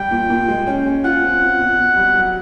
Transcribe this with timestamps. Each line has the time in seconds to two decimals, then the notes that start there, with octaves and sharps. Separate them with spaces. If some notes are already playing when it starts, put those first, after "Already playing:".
Already playing: G3 G5
0.11 A#2
0.30 A#2
0.48 G#3
0.67 C#4
0.86 C#4
1.04 F4 F#5
1.22 C4
1.41 F4
1.60 B2
1.78 B2
1.96 G3
2.16 F#3